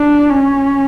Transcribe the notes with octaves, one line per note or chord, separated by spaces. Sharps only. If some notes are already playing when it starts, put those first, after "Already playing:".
Already playing: D4
C#4